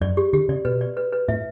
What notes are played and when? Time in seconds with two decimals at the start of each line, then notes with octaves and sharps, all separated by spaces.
0.01 F#2 D5
0.17 G4
0.33 D3 G4
0.49 C#3 D5
0.65 B2 B4
0.81 D5
0.97 B4
1.13 B4
1.28 A2 E5